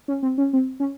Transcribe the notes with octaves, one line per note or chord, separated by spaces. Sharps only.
C#4
C4
C#4
C4
C#4